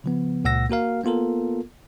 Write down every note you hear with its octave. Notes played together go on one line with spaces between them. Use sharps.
C#3 F3 B3
C#2 A#2 F#5 E6 A#6
A#3 F#4 A#4 F5
A#3 B3 F4 A4 A#4